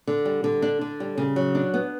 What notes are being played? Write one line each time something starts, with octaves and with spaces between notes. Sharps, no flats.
D3
G3
D3
D4
D3
G3
C#3
F#3
D4
B3